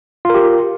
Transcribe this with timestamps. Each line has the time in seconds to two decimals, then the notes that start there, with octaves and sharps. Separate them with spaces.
0.25 F4
0.30 A#4
0.34 G4